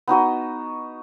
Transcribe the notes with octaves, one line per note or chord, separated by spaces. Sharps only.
B3 D#4 F#4 D#5